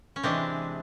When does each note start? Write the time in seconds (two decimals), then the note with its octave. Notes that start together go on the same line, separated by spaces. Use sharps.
0.16 C#4
0.23 C3 E3 G#3 C4 D4